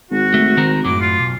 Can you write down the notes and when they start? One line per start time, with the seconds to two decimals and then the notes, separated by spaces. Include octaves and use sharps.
0.11 G#1 F#4
0.34 A3
0.57 D#3 C4 A#4
0.85 F#2 A2 F#3 D6
1.01 F4
1.19 B1